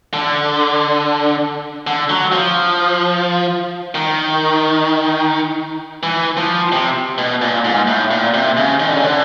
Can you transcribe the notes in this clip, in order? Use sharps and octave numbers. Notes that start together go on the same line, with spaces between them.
D3
D3
F#3
F3
D#3
E3
F3
C3
B2
A#2
G#2
A2
A#2
C3
C#3
D#3
D3
C#3
D3